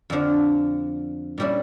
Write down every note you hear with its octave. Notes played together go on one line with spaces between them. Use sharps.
F2 D3 F3
A#2 G3 C#4 E4